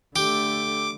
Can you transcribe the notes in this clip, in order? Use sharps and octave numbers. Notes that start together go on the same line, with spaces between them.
D3 A3 G4 D6